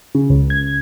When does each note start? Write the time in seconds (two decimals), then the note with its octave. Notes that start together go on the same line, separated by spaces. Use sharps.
0.15 C#3
0.30 C#2
0.50 G#6